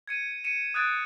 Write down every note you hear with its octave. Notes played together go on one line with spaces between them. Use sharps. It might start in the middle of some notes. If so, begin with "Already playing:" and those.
G#6 C#7 D#7
C#7 D#7 E7
D#6 F#6 G#6 A6 D7